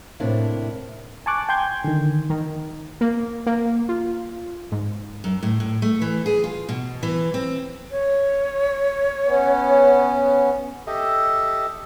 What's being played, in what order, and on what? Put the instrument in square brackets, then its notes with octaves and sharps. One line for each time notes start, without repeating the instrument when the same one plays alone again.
[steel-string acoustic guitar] A2 C3 A#3 D4 E4
[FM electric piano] G#5 A5 C#6 D6 F#6
G5 G#5 C6 G6 G#6
D3 D#3
[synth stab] D#3
A#3
A#3
F4
G#2
[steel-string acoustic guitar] F#2
A2
A2
A3
E3
G#4
F4
B2
E3
C4
[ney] C#5
[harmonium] B3 C#4
[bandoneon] G4 A4 D#5 E5